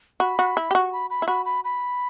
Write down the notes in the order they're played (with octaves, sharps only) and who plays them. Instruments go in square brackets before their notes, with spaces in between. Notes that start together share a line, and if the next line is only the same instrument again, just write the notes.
[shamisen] F#4 [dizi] B5
[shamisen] F#4
E4
G4
[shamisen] F#4 [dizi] C#6
[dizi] B5
B5
[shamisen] E4
[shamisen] F#4 [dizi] B5
[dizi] B5
B5